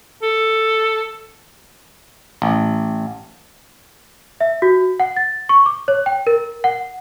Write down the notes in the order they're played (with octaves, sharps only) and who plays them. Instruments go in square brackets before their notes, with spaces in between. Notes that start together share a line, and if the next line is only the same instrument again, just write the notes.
[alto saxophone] A4
[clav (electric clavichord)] A1
[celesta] E5
F#4
F#5
A6
C#6
D6
C#5
G5
A#4
F#5